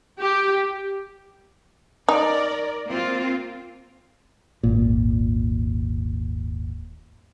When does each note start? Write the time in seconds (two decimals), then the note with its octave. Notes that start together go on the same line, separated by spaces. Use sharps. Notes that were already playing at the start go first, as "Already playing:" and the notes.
0.20 G4
2.09 D#4 A#4 D5
2.88 A#3 C4 F4
4.63 D#1 G#1 A#2